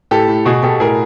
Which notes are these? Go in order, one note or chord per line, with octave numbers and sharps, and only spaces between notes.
A2 G4 A4
A2
B2 F#4 G#4
B2 G4 A4
A2 G#4 A#4